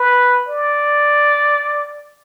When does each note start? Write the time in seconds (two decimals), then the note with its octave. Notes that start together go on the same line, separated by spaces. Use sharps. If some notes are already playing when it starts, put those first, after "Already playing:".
Already playing: B4
0.49 D5